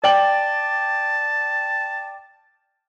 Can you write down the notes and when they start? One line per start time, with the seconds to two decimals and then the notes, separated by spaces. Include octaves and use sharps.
0.04 D5 G5 A5 F#7